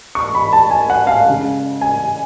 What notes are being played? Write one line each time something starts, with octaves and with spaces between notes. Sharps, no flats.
C#6
B5
A5
G#5
F#5
F5
C#3 G#3
G#5